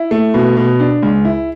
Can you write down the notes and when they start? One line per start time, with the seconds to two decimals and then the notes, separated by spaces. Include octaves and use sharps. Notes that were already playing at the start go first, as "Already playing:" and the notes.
Already playing: E4
0.11 A3
0.34 B2
0.57 B2
0.80 D4
1.02 C#2
1.25 E4